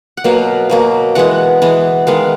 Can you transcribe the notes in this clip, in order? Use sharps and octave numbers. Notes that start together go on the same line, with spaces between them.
F#5
B2 F#3 A#3 F5
B2 F#3 A#3
E3 G#3 B3 F#5
E3 G#3 B3
D#3 G#3 B3 F5